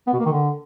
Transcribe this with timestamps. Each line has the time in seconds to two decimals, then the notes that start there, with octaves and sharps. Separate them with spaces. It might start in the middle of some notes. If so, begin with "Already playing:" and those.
0.07 B3
0.13 B2
0.19 A#3
0.26 D#3
0.32 D3